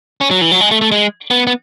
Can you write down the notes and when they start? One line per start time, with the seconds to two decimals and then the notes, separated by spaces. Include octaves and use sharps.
0.21 C#4
0.31 F#3
0.41 E3
0.51 F#3
0.61 G#3
0.71 A3
0.81 A3
0.92 G#3
1.31 B3
1.47 B3